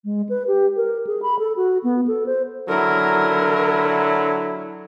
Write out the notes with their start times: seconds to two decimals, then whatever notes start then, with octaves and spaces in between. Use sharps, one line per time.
0.04 G#3
0.29 B4
0.47 G4
0.76 A#4
1.07 G#4
1.22 B5
1.39 A4
1.56 F#4
1.83 B3
2.07 A4
2.26 C5
2.69 D3 F#3 E4 A#4